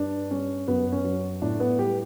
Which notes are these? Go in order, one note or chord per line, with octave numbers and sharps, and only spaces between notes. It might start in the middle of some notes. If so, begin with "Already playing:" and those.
Already playing: G2 D4
G3 C#4
F#2 B3
C#4
F#3
A2 D4
B3
G3 G4